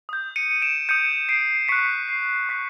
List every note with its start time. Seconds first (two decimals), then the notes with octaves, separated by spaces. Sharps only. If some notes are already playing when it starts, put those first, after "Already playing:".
0.09 D#6 G6
0.36 C#7 D#7
0.62 D7 E7
0.89 D#6 G6 C#7 D#7
1.29 C7 D7
1.68 C#6 F#6 B6 C#7
2.09 C7
2.49 C#6 F#6 B6